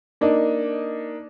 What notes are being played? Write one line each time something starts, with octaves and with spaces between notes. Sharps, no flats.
A#3 D4 D#4